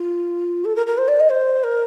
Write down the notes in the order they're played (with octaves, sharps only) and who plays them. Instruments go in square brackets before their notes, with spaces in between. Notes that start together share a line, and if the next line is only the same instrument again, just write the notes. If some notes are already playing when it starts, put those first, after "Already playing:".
Already playing: [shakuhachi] F4
A4
A#4
A#4
C5
D5
D#5
C5
A#4